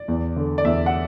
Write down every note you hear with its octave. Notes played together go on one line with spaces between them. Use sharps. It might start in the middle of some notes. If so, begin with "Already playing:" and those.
Already playing: D5
E2
D3
D5
E2 E5
F#5